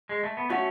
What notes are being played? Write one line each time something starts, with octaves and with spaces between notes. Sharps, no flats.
G#3
A3
B3
A3 C#4 F#4